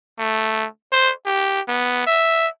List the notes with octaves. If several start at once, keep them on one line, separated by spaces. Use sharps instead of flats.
A3
C5
G4
B3
E5